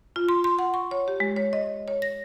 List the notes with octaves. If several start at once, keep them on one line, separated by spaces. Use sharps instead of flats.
F4
C6
C6
F#5
C#6
C#5
G4
G#3
C#5
D#5
C#5
A#6